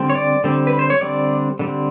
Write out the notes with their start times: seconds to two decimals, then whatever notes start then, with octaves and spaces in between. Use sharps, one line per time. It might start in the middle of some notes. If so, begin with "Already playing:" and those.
Already playing: D3 G3 C4
0.10 C#5
0.15 D5
0.44 D3 G3 C4
0.67 B4
0.79 C5
0.90 C#5
1.01 D3 G3 C4 D5
1.59 D3 G3 C4